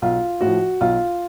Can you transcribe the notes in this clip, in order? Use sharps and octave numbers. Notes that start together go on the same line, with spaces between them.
B1 F4
A2 F3 F#4
B1 F4